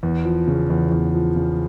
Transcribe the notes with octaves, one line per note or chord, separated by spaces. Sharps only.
E2
F3
C#3
E2
E2
F3
C#3